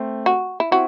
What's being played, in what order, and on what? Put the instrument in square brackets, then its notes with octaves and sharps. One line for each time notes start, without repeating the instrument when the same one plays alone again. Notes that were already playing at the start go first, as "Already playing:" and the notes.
Already playing: [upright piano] A3 C4
[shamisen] F#4
E4
[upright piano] C4 E4 [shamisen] F#4